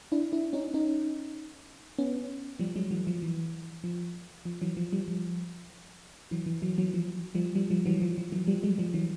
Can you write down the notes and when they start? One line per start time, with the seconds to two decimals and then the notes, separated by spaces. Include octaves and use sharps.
0.12 D4 E4
0.32 D4 E4
0.53 C#4 D#4
0.74 C#4 D#4
1.98 B3 C#4
2.59 F3 G3
2.75 F#3 G#3
2.91 E3 F#3
3.07 F3
3.22 E3
3.84 F3
4.45 F3
4.61 E3 F#3
4.77 F3
4.92 F3 G3
5.08 F3
6.31 E3 F#3
6.46 E3
6.62 E3 F#3
6.78 E3 F#3
6.94 F3
7.35 F3 G3
7.55 F3 G3
7.70 F3 G3
7.86 E3 F#3
8.02 F3
8.18 F3
8.32 E3 F#3
8.47 F3 G3
8.63 F#3 G#3
8.78 F3 G3
8.94 E3 F#3